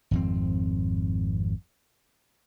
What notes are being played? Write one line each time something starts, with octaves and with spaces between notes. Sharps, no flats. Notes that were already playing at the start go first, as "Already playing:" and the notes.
G#1 F2 C4